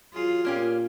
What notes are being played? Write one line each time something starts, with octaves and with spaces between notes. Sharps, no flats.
F#3 F4 G#4
A#2 A#3 C#4 G4